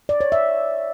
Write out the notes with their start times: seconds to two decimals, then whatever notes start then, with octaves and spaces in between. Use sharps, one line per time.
0.09 D5
0.21 C#5
0.32 E5